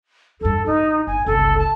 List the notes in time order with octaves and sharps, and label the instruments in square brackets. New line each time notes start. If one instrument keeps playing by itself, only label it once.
[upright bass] E2 G2 [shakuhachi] A4
[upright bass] A1 [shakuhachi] D#4
[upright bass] G1 [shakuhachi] G#5
[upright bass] G1 C#2 [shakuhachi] A4
[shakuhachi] A5